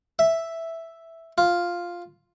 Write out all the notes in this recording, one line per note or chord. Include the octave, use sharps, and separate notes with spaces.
E5
F4